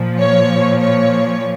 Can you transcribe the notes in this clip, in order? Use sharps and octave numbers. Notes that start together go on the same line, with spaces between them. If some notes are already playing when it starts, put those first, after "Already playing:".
Already playing: A#2 F3
C#5
C#5